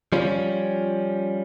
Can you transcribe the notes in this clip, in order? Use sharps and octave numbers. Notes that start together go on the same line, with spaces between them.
F3 G3 C#4